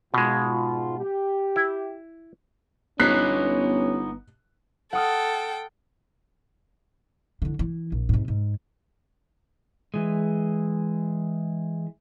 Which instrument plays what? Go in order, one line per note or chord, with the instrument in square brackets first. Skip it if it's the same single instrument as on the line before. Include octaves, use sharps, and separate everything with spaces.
[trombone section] G#2 F4 [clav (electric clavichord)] B2 G#3
[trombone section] G4
[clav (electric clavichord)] E4
[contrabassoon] G1 [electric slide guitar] B3 D#4 [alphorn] C#4 [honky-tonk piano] F#6 B6 C7
[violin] A4 G5 [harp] F#5 D#6 F6
[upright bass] D3 E3
E3
A#1
G#2 C3
G#2
[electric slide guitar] E3 G#3